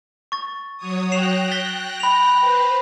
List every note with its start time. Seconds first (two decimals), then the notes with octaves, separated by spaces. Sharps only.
0.32 C#6 A6
0.77 F#3 C#5 D#6
1.12 G5 F#6 A#6 C7 E7 F7
1.51 A6 B6 G7
2.00 B5 F7
2.40 B4 C5